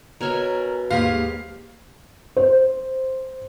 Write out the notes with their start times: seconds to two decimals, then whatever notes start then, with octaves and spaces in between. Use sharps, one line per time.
0.21 B2 A#4 C#5 E5 G#5
0.91 D#2 G#2 G4 G#4 B4 F5 A#5 C6
2.36 C5